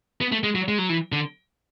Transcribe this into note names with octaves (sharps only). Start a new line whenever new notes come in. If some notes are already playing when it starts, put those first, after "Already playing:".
B3
A3
G#3
F#3
G#3
F#3
E3
D3